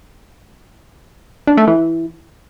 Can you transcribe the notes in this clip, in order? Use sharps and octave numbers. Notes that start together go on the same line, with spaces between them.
D4
A3
E3